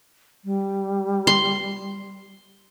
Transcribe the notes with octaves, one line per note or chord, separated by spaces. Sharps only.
G3
C6